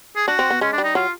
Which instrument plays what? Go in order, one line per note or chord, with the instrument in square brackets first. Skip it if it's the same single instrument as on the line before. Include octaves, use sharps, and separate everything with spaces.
[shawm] G#4
[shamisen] D4 [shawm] F#4
[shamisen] C4
B3
[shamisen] G#3 [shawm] C#4
[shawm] D4
[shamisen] G3
[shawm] D#4
[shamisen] F#3 [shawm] F4